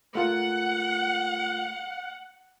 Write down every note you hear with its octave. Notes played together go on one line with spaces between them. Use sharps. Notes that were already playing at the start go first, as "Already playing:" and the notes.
A3 F4 A#4 F#5